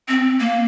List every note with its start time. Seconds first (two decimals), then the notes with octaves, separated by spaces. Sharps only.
0.08 C4
0.40 A#3